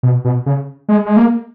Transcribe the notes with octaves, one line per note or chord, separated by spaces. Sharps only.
B2
B2
C#3
G#3
G#3
A#3